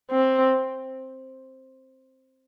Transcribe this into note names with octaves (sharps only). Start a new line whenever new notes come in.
C4